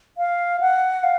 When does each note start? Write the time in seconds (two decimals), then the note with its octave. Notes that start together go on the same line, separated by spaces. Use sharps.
0.18 F5
0.60 F#5
1.04 F5